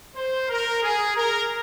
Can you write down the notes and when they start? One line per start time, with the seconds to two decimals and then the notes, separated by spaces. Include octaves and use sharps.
0.16 C5
0.49 A#4
0.83 G#4
1.16 A#4